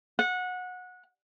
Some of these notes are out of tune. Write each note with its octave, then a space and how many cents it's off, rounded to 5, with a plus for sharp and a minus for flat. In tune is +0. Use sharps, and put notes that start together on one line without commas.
F#5 -20